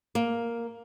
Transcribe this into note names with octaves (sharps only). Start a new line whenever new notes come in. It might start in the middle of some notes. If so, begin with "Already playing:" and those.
A#3